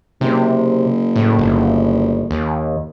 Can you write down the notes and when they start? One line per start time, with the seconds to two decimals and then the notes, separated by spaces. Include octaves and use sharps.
0.21 F#1 C3
1.16 A2
1.39 G1
2.31 D#2